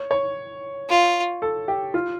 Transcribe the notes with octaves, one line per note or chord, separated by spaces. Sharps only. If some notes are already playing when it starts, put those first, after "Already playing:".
Already playing: C#5
C#5
F4
A4
G4
F4